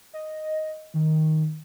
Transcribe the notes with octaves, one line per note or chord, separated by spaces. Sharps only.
D#5
D#3